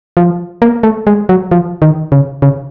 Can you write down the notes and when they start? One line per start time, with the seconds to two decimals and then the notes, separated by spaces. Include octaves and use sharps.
0.17 F3
0.62 A#3
0.83 A3
1.07 G#3
1.29 F#3
1.51 F3
1.82 D#3
2.12 C#3
2.42 C#3